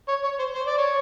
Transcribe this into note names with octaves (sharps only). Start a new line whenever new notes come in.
C#5
C#5
C5
C5
D5
C#5